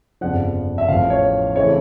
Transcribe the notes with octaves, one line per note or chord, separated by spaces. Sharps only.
G1 F2 C#3 F3 F#5
E5
A1 A2 F3 F5
C#5
C#3 E3 A3 C4 C#5